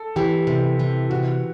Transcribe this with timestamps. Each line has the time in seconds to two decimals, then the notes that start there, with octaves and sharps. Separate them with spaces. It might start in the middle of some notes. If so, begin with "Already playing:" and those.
Already playing: A4
0.16 E3 G4
0.47 C3
0.79 E3
1.10 C3 F#4